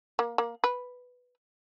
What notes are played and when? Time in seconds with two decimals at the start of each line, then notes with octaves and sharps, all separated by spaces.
0.19 A#3
0.38 A#3
0.64 B4